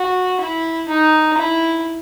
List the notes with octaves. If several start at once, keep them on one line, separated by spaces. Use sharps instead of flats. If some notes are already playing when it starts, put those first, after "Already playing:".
Already playing: F#4
E4
D#4
E4